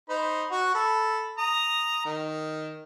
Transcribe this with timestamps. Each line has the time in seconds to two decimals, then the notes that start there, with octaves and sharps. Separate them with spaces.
0.09 D#4 C5 B5
0.52 F#4 F#5
0.74 A4 B5
1.38 A#5 D#6
2.05 D#3